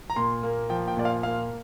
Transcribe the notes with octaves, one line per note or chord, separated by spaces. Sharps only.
A#5
A#2 C6
A#3
F3 G5
G5
A#2 D5
F5
A#3 F5